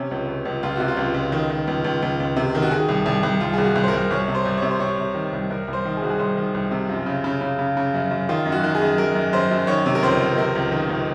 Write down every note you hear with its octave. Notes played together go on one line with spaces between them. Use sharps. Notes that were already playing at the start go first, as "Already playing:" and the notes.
Already playing: C3 C#4
C#2
C#2
C#2
C#2 F4
C3 F#4
F4
C#2
C#2
D#3
D#3
C#2
C#2
C#2
C#2
C3
D#3
F#4
D#3 G#4
C2
C2
C2
C2 F4
C2 G#4
F#4
C2
C5
A#4
C2
C2 C#5
C3
C5
C2
C3 C#5
C5
C3 C#5
C3
D#3
C2
C2 A#4
C2
C5
D#3
G#4
C2 F#4
G#4
C2 C5
D#3
C2
C3
F#2 F4
C#3
C#3
C#3
C#3
C#3
F#2
F#2
D#3 F4
F#2
F#4
D#3
G#4
F#2
F#2 A#4
F#2
F#2 C5
F#2
D#3 C#5
C3
A#4
C#2 C5
C#2
C3 A#4
C#2
D#3
C#2